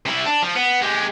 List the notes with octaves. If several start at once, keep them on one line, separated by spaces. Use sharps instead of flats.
C3 E4
D4
F3
B3
G#3 G4